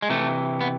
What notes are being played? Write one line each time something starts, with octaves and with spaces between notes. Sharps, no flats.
G#3
C3 E3 A3
B3